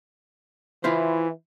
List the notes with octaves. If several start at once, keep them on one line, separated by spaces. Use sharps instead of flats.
E3 E4 F4 C5